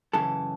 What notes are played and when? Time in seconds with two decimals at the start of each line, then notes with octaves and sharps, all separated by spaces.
0.13 F#2 C#3 E3 A4